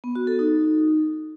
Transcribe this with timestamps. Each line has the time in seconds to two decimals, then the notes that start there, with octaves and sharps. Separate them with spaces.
0.04 B3
0.15 F#4
0.27 A4
0.39 D#4